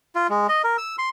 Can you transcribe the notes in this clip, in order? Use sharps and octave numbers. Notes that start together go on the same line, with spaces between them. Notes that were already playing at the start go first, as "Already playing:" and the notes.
F4
G#3
D#5
A#4
E6
C6